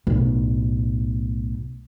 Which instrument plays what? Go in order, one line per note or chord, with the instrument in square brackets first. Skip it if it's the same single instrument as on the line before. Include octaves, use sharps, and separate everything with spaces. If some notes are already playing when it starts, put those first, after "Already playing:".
[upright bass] B1 A2